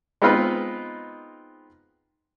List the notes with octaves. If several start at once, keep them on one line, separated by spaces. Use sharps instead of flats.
G#3 B3 C4 D#4 F4 B4